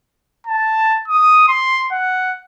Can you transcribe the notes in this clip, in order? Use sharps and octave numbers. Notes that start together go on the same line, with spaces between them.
A5
D#6
C6
F#5